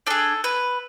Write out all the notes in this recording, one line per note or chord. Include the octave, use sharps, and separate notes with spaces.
D4 G#4 A4
B4